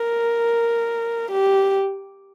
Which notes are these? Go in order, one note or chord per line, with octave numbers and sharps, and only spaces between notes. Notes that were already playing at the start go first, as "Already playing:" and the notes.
Already playing: A#4
G4